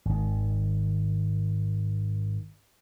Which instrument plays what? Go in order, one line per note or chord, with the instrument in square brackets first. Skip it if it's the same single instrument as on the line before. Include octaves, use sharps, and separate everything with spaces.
[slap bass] G#1 D#3